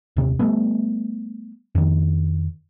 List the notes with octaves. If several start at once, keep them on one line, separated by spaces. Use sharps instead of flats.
D#1 C3
G3 A3 B3
F2 D#3